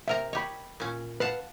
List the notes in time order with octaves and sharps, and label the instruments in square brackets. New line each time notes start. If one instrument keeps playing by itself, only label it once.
[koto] C3 A#4 A#5 [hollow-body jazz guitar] E5
[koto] G4 C#5 [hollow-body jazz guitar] D#5 B5
[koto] A#2 C#4
[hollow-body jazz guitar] B4 [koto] F5 F#5 A5